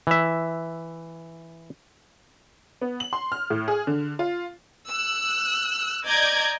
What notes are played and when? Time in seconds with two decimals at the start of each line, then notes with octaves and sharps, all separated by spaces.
0.07 E3 E5
2.81 B3
3.00 F#7
3.13 C6
3.32 F6
3.50 A2
3.68 G#4
3.87 D3
4.19 F4
4.90 E6 F#6
6.07 D5 D#5 A#5 G6 G#6